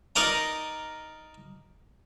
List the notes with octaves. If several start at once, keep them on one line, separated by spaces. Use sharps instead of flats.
D#4 A#4 D5 D#5 A#5